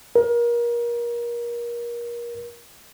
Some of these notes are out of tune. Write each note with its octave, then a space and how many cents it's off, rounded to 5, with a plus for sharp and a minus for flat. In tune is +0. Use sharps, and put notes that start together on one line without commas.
A#4 +30